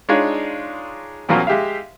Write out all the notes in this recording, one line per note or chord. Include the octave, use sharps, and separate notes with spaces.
G#3 D4 D#4 F4 C#5
E2 A#2 F3 F#3 A#3 C#4
G#3 G4 E5 F5